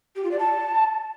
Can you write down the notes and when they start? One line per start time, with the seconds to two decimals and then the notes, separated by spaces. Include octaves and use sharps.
0.16 G4
0.24 F4
0.31 D5
0.39 A5